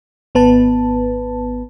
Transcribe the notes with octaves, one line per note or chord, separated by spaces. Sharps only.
G#1 B3 B4 A5